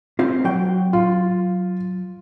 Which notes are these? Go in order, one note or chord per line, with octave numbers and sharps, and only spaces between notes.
C4 F4 C5
F#3 G5
F4